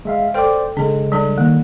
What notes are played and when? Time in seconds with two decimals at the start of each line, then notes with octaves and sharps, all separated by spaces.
0.05 G#3 E5 F5
0.34 A4 C5 D5 G5 D6
0.77 C#3 G#3 D4 A4
1.12 G3 D4 A4
1.38 D#3 A#3